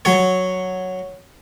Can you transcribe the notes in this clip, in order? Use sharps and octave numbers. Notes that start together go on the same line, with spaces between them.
F#3 C#5